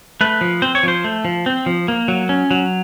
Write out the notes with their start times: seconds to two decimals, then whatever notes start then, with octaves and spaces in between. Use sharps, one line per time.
0.21 A3 B4
0.41 F3
0.62 C4 C5
0.75 C#5
0.83 F3 C5
1.04 A3
1.25 F3
1.46 C4
1.66 F3
1.88 A#3
2.08 F#3
2.29 C#4
2.51 F#3